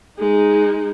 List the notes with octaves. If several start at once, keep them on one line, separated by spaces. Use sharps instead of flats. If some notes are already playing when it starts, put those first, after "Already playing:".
G#3 D#4